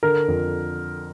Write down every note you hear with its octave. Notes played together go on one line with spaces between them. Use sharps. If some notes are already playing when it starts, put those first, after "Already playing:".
D3 A#4
F2